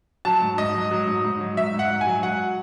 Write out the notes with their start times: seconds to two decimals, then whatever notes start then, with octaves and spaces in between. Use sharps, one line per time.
0.25 F#3 A5
0.42 G#2
0.58 G#2 D#5
0.75 F#3
0.91 F#3
1.07 G#2
1.24 G#2
1.41 F#3
1.57 F#3 E5
1.74 G#2
1.79 F#5
1.90 G#2
2.01 G#5
2.07 F#3
2.23 F#3 F#5